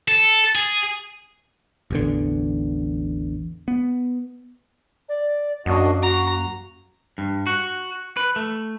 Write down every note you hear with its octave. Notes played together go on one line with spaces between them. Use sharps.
A4
G#4
A1 E2 D3
B3
D5
F#2 A#3 D4 F#4 D#5
F#4 A#5
G2
F#4
B4
A3